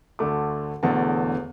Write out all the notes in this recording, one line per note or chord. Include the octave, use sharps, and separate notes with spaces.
D2 D3 A3 D6
E1 E2 D3 A3 A5